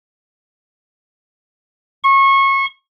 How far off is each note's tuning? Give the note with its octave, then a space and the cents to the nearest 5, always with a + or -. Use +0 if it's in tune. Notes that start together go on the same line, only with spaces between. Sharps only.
C#6 -25